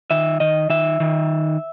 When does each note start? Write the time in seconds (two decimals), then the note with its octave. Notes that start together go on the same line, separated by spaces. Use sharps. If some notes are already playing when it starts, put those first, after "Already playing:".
0.11 D#3 E5
0.40 D#3 D#5
0.70 D#3 E5
1.00 D#3